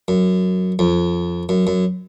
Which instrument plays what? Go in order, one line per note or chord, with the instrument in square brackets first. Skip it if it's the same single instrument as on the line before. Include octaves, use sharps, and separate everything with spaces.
[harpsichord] F#2
F2
F#2
F#2